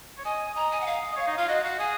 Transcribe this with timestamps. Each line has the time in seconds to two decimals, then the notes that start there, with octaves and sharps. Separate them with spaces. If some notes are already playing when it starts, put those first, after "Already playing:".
0.18 C#5
0.25 D#5 G#5
0.55 D#5 A#5
0.71 G#5
0.81 F#5
0.87 F5
1.12 D#5
1.16 C#5
1.27 D#4
1.37 F4 F5
1.48 F#4 D#5
1.64 F#4 F5
1.78 G#4 G#5